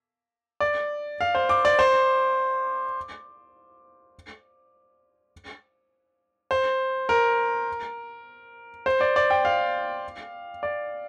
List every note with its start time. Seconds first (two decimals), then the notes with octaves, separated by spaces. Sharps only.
0.60 D5
1.21 F5
1.35 C5
1.49 D6
1.65 D5
1.79 C5
6.51 C5
7.09 A#4
8.86 C5
9.01 D5
9.16 D5
9.30 G5
9.45 F5
10.63 D5